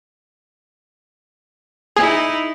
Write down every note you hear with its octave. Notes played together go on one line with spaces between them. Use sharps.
D#4 E4 G#4